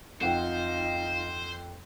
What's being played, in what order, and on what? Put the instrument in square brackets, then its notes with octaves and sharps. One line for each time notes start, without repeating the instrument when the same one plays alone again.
[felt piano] F2 F#5 G5 [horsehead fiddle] D#4 F4 [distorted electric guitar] C5